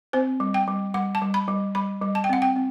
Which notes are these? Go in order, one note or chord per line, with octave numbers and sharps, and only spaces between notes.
C4 C5
G3
G5
G3
G3 F#5
A5
G3
B5
G3
G3 B5
G3
A5
G5
C4 F#5
G5
C4